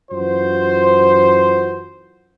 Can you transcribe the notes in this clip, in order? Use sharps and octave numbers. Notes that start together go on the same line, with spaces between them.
F#2 E3 F4 F#4 C5